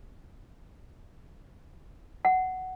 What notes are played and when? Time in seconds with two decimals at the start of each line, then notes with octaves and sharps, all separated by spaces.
2.25 F#5